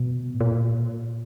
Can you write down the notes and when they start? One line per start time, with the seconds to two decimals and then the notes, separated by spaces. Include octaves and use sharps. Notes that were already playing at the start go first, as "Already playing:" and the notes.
Already playing: B2
0.34 A2
0.41 A#2